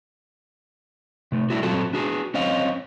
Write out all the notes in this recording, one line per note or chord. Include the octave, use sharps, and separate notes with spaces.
C3 A3
G3 A3 D4 E4 F#4
A#2 F#3 C4 F4 F#4 A4
D4 F#4 G#4
C4 C#4 C#5 D#5 F5